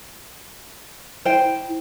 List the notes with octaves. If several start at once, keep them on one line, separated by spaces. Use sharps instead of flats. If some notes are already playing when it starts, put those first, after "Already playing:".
E4 C5 G5